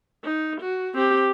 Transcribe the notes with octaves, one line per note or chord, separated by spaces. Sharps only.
D#4
F#4
C4 G4